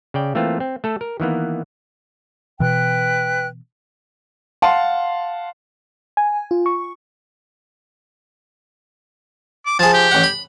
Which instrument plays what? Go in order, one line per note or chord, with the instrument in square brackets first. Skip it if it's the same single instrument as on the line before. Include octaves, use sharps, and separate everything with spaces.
[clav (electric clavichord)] C#3 D5 G5
E3 A3 A#3 C4 F4
C4
A3 A4
A#4
D#3 E3 A#3 B3
[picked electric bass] B2 E3 [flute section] B4 G5 F#6
[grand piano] F5 F#5 A5 C6
[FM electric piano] G#5
F4
C#6
[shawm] D6
[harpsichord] F3 G#4 [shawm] A5
[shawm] G4
[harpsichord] A1 F#5
B5